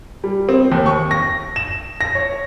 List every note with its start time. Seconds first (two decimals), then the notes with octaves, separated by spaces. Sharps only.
0.24 G3
0.49 C4
0.72 D#2
0.86 C#6
1.11 A#6
1.56 E7
2.01 A#6
2.15 C#5